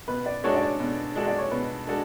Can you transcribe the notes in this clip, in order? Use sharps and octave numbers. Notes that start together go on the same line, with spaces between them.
B2 B4
D5
G#3 D4 F#4 A4 C#5
D5
C#5
B2
G#3 D4 F#4 A4
D5
C#5
B2 B4
G#3 D4 F#4 A4